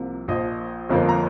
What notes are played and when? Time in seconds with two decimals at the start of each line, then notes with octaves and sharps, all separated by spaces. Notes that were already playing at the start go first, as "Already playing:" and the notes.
Already playing: C2 C3 F3 A#3
0.28 A#1 A#2 F3 D#5
0.90 G1 F2 F3 A#3
1.09 A#5